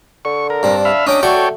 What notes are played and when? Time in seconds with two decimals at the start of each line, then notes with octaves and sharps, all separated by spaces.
0.25 D3 C#6
0.50 A#4
0.63 G2 C4 D4
0.85 E5 F5 B5
1.07 F#3 C#4 D4 D#5 G5 D6
1.23 A3 F#4 A4 C#5 D5 G5 C#6